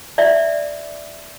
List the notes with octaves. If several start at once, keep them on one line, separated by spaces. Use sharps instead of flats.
D5 E5